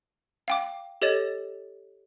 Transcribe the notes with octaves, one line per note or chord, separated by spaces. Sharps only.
F5 G5 D6
G4 A4 C#5 D#5 A6 E7